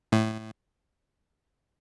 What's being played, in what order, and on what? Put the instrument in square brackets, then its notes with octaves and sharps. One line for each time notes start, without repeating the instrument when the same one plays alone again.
[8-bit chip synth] A2